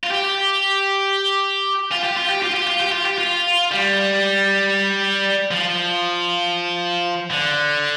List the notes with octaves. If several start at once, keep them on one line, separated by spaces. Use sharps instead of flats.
F4
G4
F4
G4
F4
G4
F4
G4
F4
G4
F4
G4
F4
G3
F3
D3